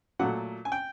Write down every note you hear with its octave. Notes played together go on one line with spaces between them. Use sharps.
A#2 F#3 A3 F#5
G#5
G5